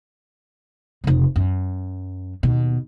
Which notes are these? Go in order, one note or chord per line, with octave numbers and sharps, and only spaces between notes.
F1 C#3
F#2
D#2 B2